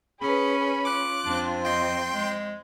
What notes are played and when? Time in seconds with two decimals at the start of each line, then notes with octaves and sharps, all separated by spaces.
0.21 C#4 G#4 B4 B5
0.85 F4 D6 F#6
1.26 F2 C4 D4
1.65 D#5 G5 C6
2.14 G#3